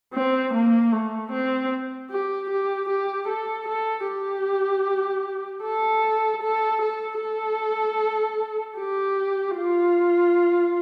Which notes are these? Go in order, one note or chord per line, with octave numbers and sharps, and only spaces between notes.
C4
A#3
A3
C4
G4
G4
G4
A4
A4
G4
A4
A4
A4
A4
G4
F4